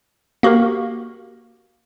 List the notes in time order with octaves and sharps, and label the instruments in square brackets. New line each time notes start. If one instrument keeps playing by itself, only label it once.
[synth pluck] A#3 F#4 G4 A#4